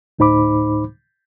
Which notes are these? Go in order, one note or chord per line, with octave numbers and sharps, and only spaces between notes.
D2 A2 D#4 C5 B5 D6